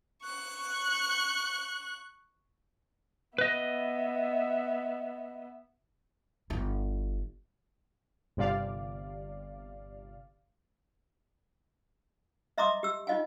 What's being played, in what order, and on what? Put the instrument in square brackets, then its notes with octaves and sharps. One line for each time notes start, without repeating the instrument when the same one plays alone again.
[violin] C#6 F#6
[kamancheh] B3 E5 [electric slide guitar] B4 D#5
[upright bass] G1 E4
[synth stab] G1 C3 D5 F5
[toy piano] D#5 E5 A#5 C6 D6 D#6
G4 E6
D#4 F4 D#5 F5 G#5